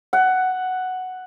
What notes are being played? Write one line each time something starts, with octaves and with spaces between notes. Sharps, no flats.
F#5